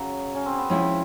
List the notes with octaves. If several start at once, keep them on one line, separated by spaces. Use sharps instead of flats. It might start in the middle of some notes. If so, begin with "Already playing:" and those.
Already playing: C#3 F#3
C#4
C4
B3
F3 G#3 C4 C#4 E4 G#4